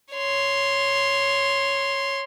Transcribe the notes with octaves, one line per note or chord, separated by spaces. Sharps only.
C#5 C6